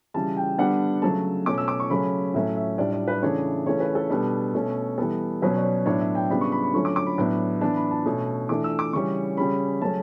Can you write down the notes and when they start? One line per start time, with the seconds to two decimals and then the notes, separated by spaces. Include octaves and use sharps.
0.14 C#3 E3 G3 A5
0.37 G5
0.58 D3 G3 B3 D4 F#5
1.02 C#3 F#3 A3 A5
1.46 B2 A3 C#4 D6
1.58 E6
1.68 D6
1.80 C#6
1.90 C#3 F#3 A3 C#4 B5
2.34 A2 F#3 A3 C#4 E5
2.56 E5
2.78 A2 G3 D4 D5
2.93 D5
3.08 B4
3.22 C#3 E3 A3 D4 C#5
3.66 C#3 E3 A3 C#4 C#5
3.80 B4
3.95 A4
4.10 B2 G3 B3 D4
4.54 B2 A3 C#4
4.98 E3 G3 B3 A4
5.42 B2 F#3 C#4 B4
5.56 D5
5.64 C#5
5.86 A2 F#3 B3 D4 C#5
6.01 E5
6.15 G5
6.30 C#3 G3 B3 D4 B5
6.41 C#6
6.52 B5
6.64 B5
6.74 D3 F#3 A3 C#4 C#6
6.85 D6
6.96 D6
7.06 B5
7.18 A2 F#3 B3 D4
7.61 E3 B3 D4 A5
7.77 B5
7.91 A5
8.06 B2 A3 C#4
8.49 E3 A3 D4 D6
8.64 E6
8.79 D6
8.93 C#3 E3 G3 C#4 C#6
9.37 C#3 G3 C#4 B5
9.82 C#3 F#3 A3 C#4 A5